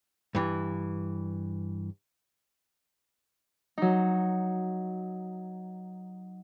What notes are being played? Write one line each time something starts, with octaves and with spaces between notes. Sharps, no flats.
G2 E3
F#3 D#4